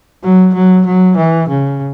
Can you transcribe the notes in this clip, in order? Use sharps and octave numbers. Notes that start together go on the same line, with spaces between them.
F#3
F#3
F#3
E3
C#3